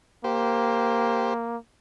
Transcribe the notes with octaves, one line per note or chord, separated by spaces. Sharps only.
A#3 G4 C5